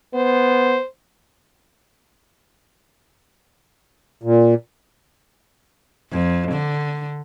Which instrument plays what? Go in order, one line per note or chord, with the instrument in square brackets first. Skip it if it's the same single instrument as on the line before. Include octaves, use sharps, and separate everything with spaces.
[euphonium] B3 [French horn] C5
[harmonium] A#2
[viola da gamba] F2
D3